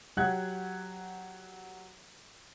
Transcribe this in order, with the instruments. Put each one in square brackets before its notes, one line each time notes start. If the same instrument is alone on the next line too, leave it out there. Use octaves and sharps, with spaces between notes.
[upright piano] F#3 G4 F#5 F#6 G#6